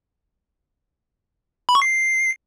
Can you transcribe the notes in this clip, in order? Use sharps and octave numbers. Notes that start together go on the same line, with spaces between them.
B5
C#6
C7